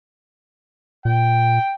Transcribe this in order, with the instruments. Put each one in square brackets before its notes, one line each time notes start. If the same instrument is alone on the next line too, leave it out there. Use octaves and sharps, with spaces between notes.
[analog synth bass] A#2 [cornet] G5